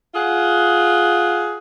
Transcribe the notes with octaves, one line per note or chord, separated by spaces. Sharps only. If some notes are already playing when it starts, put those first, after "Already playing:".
F4 G#4 F#5